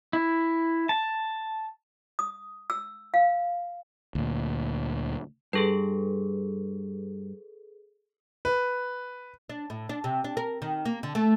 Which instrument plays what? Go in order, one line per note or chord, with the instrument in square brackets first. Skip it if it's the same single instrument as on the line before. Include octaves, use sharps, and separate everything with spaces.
[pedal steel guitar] E4
A5
[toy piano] D#6
E6
F5
[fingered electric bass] D2 A#2
[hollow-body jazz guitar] G2 [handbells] G#4 A4 B4
[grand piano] B4
[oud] D4
A2
D4
C3
D4
A#4
D#3
A#3
D3
A3